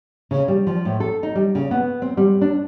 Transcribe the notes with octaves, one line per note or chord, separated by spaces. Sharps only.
C#3
G3
F3
A2
A4
D#4
G3
C#3
B3
C4
G3
D4